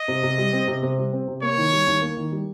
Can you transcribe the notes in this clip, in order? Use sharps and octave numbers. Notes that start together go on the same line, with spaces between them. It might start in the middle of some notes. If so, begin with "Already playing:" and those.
Already playing: D#5
C3
C3
G3
C4
C3
C3
G3
C4
C3
A#3 C#5
D#3
G3
D#2
A#3
D#3
G3